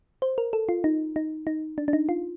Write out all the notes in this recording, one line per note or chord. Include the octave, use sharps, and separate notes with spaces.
C5
A#4
A4
F4
D#4
D#4
D#4
D4
D4
D#4
F4